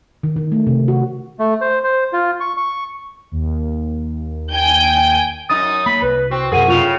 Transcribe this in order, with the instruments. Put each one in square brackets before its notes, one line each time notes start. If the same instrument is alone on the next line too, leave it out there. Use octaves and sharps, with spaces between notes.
[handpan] D#3
D#3
A3
C3
F#4
[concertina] A3
C5
C5
F4
C#6
C#6
[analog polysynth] D#2
[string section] G5 G#5 G6
[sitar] F#2 D#4 [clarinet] D#6 [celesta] A6
[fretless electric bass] A#3 [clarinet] B5
[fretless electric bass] C2 [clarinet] B4
[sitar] C4 [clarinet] F#4
[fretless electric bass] F#2 C3 [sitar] G#4 [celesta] A#4 F#5 D#7
[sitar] A2 C#3 [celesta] F4 C#6 F7